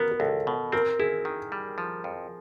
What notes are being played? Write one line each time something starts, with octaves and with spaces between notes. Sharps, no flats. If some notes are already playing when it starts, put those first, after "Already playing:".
Already playing: B3 A#4
A#4
C#2 A4
B2
C4 A#4
E4 G#4
D#3
G3
F3
F2